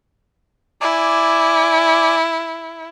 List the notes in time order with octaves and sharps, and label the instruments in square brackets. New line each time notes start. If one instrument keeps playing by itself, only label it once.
[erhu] E4 [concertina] D5 G#5 D6